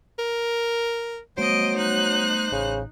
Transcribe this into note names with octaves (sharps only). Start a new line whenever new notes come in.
A#4
F#3 G3 A3 B3 C5 D#5 D7
D#4 F#6
A1 C#3